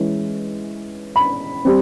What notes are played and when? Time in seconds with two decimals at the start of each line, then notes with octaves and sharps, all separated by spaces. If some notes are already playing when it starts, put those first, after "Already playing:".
Already playing: E3 G#3 C#4 E4
1.16 B5
1.65 G3 C4